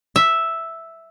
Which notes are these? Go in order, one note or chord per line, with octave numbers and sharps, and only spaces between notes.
E5